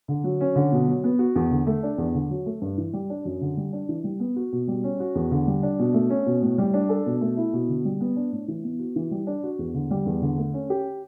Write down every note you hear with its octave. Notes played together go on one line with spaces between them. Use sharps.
D3
F#3
C#4
D3
B2
F#3
B3
F#4
E2
D3
A3
D4
E2
D3
F#3
A3
G2
E3
G3
D4
F#2
D3
G3
D4
E3
G3
B3
F#4
B2
G3
C#4
F#4
E2
D3
G3
D4
B2
A3
C#4
B2
A2
G3
D4
A4
B2
A3
E4
B2
D3
G3
B3
D4
A2
E3
B3
F#4
E3
G3
D4
F#4
E2
D3
G3
E2
D3
A3
C#4
G4